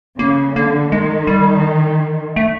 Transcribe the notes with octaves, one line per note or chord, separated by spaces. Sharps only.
C#3 A#3
D3 A#3
D#3 G#3
G3
A3